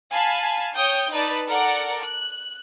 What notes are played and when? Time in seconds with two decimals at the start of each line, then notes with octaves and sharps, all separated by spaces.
0.11 F5 G#5 A5 B5
0.74 C#5 G5 D#6 G6
1.10 D#4 B4 D5 A5
1.45 A4 A#4 D5 F#5
2.02 F#6